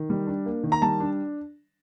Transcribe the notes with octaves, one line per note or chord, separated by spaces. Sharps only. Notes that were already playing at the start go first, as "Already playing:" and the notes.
Already playing: D#3
G3
D4
A#3
D#3
A#5
G3 A5
D4